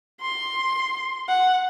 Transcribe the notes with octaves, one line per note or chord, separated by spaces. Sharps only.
C6
F#5